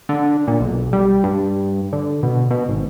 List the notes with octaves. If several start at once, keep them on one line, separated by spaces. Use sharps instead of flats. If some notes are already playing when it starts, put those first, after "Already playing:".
D3
A#2
B1
G3
G2
D3
B2
B2
G#1